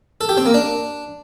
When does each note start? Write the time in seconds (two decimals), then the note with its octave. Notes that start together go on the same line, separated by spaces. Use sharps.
0.21 A4
0.29 G4
0.37 C4
0.46 A#3
0.54 D4